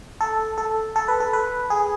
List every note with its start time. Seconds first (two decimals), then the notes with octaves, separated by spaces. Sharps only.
0.21 A4
0.58 A4
0.96 A4
1.08 B4
1.20 A4
1.33 B4
1.70 G#4